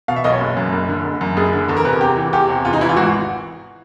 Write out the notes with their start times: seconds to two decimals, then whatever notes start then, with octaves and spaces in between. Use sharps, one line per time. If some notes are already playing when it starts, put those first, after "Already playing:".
0.08 B2 F5
0.16 E5
0.24 B1 D#5
0.32 C#5
0.41 F#1
0.57 F#2
0.73 F#1
0.89 D3
1.04 F#1
1.21 F#2
1.37 F#1 G#4
1.53 D3
1.68 E2 A4
1.77 A#4
1.85 C3 B4
1.93 A#4
2.01 E2 G4
2.17 E3
2.33 E2 G4
2.49 C3
2.65 E2 F4
2.73 D#4
2.81 E3 E4
2.89 F4
2.96 G#1 F#4